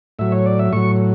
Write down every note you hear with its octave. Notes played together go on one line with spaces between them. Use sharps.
A2 F#3 E5
C#5
D5
E5
A2 F#3 C#6